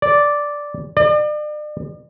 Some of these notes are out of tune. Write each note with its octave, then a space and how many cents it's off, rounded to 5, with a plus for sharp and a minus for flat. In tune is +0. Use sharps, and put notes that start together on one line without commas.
D5 -5
D5 +40